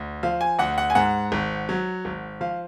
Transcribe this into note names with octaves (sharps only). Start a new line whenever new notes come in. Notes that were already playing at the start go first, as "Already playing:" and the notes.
Already playing: D2
F3 F5
G#5
D2 F#5
F#5
G#5
G#2 F#5
G#1
F#3
G#1
F3 F5